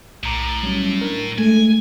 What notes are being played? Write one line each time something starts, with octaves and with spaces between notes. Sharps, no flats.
B1 A2 A#5 D6
F#3 G3 C#4
D4 A#4
G#3 A3 G#5